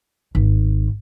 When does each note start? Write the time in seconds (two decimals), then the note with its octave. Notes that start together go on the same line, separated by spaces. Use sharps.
0.35 G#1